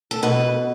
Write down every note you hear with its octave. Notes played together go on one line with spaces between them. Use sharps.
A4
B2 B4